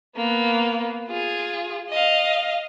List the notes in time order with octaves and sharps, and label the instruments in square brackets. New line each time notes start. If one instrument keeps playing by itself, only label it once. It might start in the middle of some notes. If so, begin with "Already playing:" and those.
[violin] A#3 B3
F4 G#4
D#5 F5